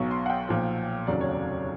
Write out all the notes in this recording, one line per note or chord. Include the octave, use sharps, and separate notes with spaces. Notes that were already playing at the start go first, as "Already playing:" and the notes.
Already playing: B1 B2 F#3 C#6
C6
F#5
G5
B1 A#2 F3
F1 D#2 C#3 F#3 D5
C#5
D5